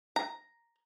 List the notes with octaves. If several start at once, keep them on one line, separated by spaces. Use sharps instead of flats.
A#5